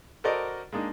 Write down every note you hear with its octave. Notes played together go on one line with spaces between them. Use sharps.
F#4 A4 A#4 C5 D5 D#5
G#3 A#3 D4 D#4